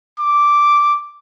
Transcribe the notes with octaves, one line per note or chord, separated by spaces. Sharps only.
D6